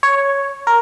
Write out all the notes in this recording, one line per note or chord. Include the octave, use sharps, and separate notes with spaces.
C#5
A#4